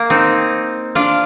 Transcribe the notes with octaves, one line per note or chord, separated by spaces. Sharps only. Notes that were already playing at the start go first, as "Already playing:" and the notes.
Already playing: A#3
C4 D#4
D4 F4